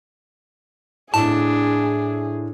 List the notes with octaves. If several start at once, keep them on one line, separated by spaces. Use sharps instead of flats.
A2 D4 G#4 A5